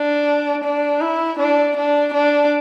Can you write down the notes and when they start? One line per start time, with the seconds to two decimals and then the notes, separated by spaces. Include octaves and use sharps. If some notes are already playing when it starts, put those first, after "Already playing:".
Already playing: D4
0.64 D4
1.01 E4
1.39 D4
1.77 D4
2.14 D4